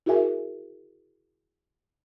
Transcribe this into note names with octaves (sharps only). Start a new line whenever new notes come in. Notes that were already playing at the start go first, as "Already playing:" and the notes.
E4 F#4 G#4 A#4 E5 G#5